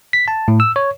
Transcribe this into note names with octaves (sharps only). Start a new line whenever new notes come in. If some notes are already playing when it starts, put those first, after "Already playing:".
B6
A5
A2
E6
C#5